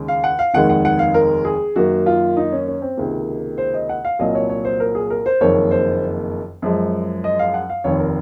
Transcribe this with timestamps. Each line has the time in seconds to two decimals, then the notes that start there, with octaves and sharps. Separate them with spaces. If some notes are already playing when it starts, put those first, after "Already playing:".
Already playing: D#2 C#3 G#3
0.08 F5
0.24 F#5
0.39 F5
0.54 F1 D#2 D#3 G#3 F#5
0.69 F#5
0.85 F#5
0.99 F5
1.14 A#4
1.45 G#4
1.76 F#2 D#3 A#3 F#4
2.06 F4
2.37 D#4
2.52 C#4
2.67 C#4
2.82 C4
2.97 C#2 C3 D#3 A#3
3.58 C5
3.74 D#5
3.89 F#5
4.05 F5
4.19 C2 A#2 F#3 A#3 D#5
4.35 C#5
4.49 C#5
4.65 C5
4.80 A#4
4.95 G#4
5.10 A#4
5.26 C5
5.41 F#1 F2 D#3 A#3 C#5
5.71 C5
6.62 F#2 F3 G#3
7.24 D#5
7.39 F5
7.54 F#5
7.70 F5
7.84 F1 D#2 D#3 C#5
7.99 A#4